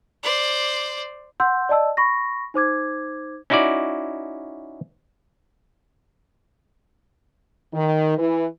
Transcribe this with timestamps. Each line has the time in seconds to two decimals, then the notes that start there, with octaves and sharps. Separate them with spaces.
0.23 C5 D5
1.40 F#5 C6 E6 G6
1.69 D5 D#5 A5 E6
1.97 B5 C#6 A#6
2.54 D#4 C5 D6 G#6
3.50 C#4 D#4 E4 F#4 D5
7.73 D#3
8.18 E3